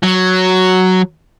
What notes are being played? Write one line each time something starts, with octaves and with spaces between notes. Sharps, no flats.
F#3